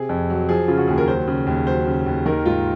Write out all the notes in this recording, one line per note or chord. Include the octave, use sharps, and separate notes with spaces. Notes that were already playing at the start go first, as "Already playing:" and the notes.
Already playing: C3 G#4
F2
F#3
F3 G#4
C#3 F4
F#4
D#2 G#4
A#4
F#3 C5
C#3
D#2
F#3 C5
C#3
D#2
D#3 A#4
G#2 F4